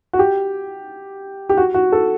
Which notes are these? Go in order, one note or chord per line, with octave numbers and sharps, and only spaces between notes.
F#4
G4
G4
F#4
F#4
A4